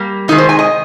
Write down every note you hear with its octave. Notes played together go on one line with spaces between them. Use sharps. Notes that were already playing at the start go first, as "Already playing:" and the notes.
Already playing: G3 A#3
C3 D#3 G#3 D#4
C5
G#5
D#5